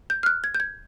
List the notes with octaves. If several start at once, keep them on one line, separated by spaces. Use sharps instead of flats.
G6
F6
F#6
G#6
G6
G#6